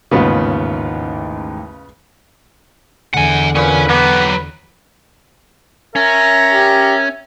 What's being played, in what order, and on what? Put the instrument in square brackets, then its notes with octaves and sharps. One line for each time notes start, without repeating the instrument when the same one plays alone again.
[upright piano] A1 D#2 G#2 [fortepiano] C#3 B3 F4
[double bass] E2 D3 [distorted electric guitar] F#5 G#5
[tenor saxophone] A#2 [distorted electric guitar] C#4 [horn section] B4
[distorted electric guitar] F#3 G4 [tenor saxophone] B3
[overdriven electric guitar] C#4 [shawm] A#4 [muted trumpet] E5
[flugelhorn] G4